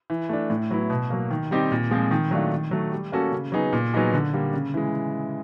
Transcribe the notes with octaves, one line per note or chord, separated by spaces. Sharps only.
E3
A3 D4
A2
F#3 B3 E4
B2
F#3 A#3
D#3
G3 C4 D#4 G4
A#2
F3 G#3 C4
D#3
F#3 A3 D4 F4
D#3
F#3 A3
G3
A#3 C#4 F#4 A4
C#3
F#3 B3 D#4 G#4
A#2
F#3 B3 D#4 G#4
D3
G3 A#3
C#3
E3 G#3